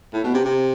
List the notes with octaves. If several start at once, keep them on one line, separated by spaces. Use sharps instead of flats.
A2
B2
C3
C3